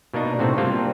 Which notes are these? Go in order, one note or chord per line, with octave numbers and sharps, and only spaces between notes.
B2 A#3 D4 D#4
A2 C3 C4 F#4
G3 A#3 C4 D4 F4 G4